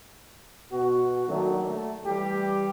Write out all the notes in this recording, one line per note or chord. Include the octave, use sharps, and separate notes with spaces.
B2 F#4
D#3 F#3 A3 A#3 D4
A3
E3 G3 G4